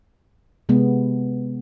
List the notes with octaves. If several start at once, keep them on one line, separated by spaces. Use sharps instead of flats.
C3 G#3 B3